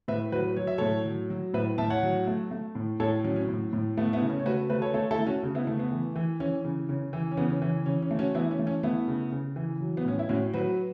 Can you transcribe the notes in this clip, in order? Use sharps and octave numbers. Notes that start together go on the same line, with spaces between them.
A2 B4 E5
F#3 F#4 B4
F#3 C#5
E5
A2 A4 C#5
F#3
F#3
A2 B4 E5
A2 E5 A5
C#5 F#5
F#3
A3
A3
A2
A2 A4 C#5
F#3 C#4
C#4
A2
A2
A3 B3
B3 E4
C#3
C#4
C#5
A3 F#4 B4
A3 F#4 B4
A4 C#5
A3 A4 C#5
E4 A4
A3
C#4 F#4
C#3
B3 E4
A3
B3
E3
E3
E3 C#4
C#3
C#3 C#4
E3
C#4
C#3 B3
C#4
E3 C#4
C#3 C#4
C#4
A3
C#4 F#4
E3 B3 E4
C#4
A3
C#4
A3 B3 E4
C#3
C#3
E3
F#3
B3
A2 C#4
E4
A2 C#4 F#4
F#3 F#4 B4